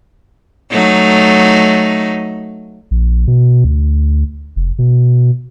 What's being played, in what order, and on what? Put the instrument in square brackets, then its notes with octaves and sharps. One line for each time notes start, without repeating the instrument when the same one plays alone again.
[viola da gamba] F#3 A3 D#4
[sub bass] A#1
B2
D2
F1
B2